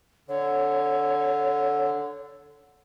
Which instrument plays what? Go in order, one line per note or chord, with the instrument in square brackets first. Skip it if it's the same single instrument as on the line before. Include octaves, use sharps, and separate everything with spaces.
[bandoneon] D3 [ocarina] C#5